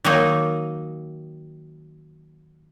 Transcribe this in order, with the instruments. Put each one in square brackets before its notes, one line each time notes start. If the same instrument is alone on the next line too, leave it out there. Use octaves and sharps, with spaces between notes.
[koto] D#3 F#3 A#3 D#4